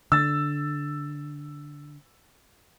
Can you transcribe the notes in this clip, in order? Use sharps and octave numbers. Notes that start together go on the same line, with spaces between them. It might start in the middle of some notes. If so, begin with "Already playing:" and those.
D3 E6 A6